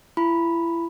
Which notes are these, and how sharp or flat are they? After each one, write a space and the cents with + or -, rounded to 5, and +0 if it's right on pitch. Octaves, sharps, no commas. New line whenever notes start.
E4 +35 B5 +0